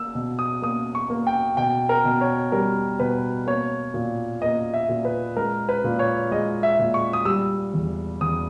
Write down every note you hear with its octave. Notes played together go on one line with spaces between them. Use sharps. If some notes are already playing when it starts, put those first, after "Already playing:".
Already playing: A#3 E6
B2
D#6
A#3 D#6
C#6
A#3
G5
B2 G5
A#4
B2
C#5
G3 A#4
B2 B4
A#3 C#5
A#2
A#3 D#5
E5
A#2
B4
G#3 A#4
B4
A#2
C#5
G#3 D#5
E5
A#2
C#6
D#6
G3 E6
E2
E2 D#6